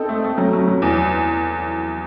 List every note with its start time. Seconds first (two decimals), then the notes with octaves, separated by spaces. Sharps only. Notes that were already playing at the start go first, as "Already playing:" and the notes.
Already playing: C4 D#4 A4
0.09 A3
0.24 A3
0.38 F#3
0.53 F#3
0.68 F#3
0.82 E2